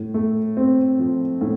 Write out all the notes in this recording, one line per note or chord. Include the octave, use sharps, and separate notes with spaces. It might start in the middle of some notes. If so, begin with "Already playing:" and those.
Already playing: A2
A3
C4
F3
A2